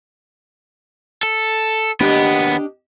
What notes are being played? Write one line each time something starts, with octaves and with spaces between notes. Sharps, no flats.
A4
D#2 B3 D4 G4 D#5